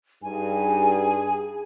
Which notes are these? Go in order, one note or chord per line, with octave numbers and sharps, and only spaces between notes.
G2 D#4 G#4 G#5